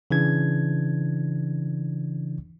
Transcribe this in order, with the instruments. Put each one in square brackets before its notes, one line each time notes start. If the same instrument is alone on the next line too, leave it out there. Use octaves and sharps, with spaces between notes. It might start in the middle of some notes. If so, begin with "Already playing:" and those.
[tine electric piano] C#3 E3 D4 G#6